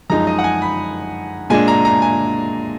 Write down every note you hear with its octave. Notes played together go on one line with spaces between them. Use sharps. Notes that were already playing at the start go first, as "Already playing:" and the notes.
F#2 F3 G#3 D#4 A#5
D#5
F#5
G#5
B5
A#2 G#3 D4 G#5
A#5
A#5
G#5